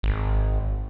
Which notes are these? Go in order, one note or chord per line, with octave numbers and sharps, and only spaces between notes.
G#1